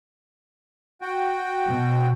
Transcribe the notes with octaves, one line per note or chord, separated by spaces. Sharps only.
F#4 G5
B2